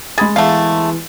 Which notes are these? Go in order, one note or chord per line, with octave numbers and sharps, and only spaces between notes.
G#3 G#4 B5 A6
E2 A3 F5